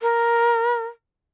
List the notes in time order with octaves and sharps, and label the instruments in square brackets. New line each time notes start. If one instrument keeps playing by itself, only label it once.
[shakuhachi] A#4